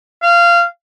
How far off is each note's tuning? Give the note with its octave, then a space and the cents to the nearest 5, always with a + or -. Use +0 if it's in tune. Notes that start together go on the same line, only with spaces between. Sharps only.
F5 -20